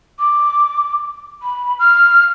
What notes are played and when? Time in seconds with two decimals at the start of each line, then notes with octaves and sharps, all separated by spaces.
0.19 D6
1.42 B5
1.79 F6